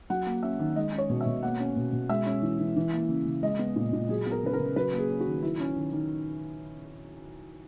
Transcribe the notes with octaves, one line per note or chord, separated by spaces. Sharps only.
F#3 F#5
A#3
C#4 E5
D#3
G#3 D#5
C#4
C#5
B2
E5
B2
A#3 F#5
C#4
B2
B2
G#3 E5
C#4
E3
E3
E3
A#3
C#3
C#3
G#3 D#5
B3
A#2
A#2
F#3 G#4
B3 A#4
C#3 B4
A#4
C#3
F#3 B4
A#3
G#4
C#4
F#4
D#3
F#3 E4
C#4
D#3
D#3